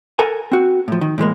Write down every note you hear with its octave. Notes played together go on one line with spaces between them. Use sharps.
A4 A#4 F#5 G#5
C4 F#4
A2 F3
D#3
A2 E3 G#3 A#3